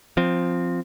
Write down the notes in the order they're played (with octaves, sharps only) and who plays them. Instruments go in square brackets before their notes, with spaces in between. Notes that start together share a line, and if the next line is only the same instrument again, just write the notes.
[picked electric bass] F3 C4